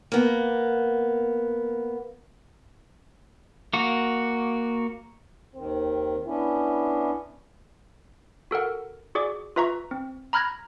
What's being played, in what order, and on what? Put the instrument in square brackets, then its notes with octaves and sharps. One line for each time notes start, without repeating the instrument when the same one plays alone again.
[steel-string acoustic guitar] A#3 B3
[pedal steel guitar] A#3 F#4
[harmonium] D#2 D#3 [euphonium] C4
[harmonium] B3 C#4 D4 [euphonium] E4
[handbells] F#4 A4 A#4 F#5
F#4 G#4 D5 D6
F4 B4 E5 A#5 C#6
C4
A#5 B5 F6 F#6 G#6 A#6